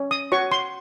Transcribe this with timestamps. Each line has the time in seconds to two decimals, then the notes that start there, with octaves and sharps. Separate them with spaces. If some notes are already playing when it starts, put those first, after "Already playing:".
Already playing: C#4
0.11 D#6
0.32 F#4 C#5 C#6
0.52 C6